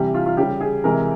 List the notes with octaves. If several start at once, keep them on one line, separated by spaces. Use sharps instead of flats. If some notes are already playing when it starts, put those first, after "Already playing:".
Already playing: C3 E3 G3 G4
F4
F4
C#3 G3 G4
G#4
C3 E3 G#3 A#4